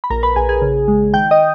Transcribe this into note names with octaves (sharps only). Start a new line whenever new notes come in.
B5
A#1 A#4 A#5
B4 B5
A#1 G#4 G#5
G#4 G#5
C#3
G#3
D#3 G5 G6
D#5 D#6